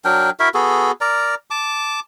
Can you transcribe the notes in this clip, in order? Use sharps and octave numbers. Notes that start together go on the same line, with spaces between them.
F#3 D4 A#4 G5
E4 F#4 A#4 E5
B3 F#4 G#4 A4
A#4 D5 A#5
A5 D6